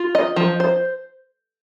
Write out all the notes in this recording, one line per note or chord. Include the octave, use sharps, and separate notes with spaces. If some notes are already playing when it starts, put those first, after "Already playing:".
Already playing: F4
D#5
F3
C5